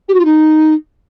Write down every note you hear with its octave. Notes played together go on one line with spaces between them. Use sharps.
G4
F#4
F4
D#4